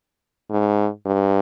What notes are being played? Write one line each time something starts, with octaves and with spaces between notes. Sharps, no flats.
G#2
G2